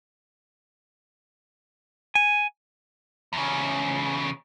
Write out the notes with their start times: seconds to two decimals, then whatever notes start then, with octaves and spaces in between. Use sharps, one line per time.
2.15 G#5
3.33 E2 C#3